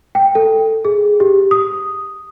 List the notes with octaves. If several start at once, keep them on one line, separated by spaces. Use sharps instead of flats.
G5
A4
G#4
G4
D#6